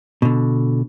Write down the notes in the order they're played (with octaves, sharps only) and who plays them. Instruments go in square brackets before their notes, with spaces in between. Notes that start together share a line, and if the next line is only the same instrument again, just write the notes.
[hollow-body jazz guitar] B2 D3